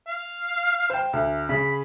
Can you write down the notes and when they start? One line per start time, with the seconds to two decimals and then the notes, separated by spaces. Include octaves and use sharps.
0.07 F5
0.90 C5 G5
1.13 D2
1.49 C#3 B5